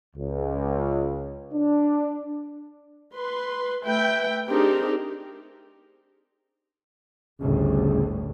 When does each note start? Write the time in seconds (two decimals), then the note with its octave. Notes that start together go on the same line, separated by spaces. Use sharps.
0.16 C#2
1.53 D4
3.13 B4 C6
3.85 A3 B4 E5 G5
4.49 C4 D4 D#4 G4 G#4 A#4
7.40 G1 D2 A2 C#3